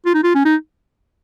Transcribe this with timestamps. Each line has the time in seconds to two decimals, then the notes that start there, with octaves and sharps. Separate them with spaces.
0.06 F4
0.14 D#4
0.24 F4
0.35 C#4
0.45 D#4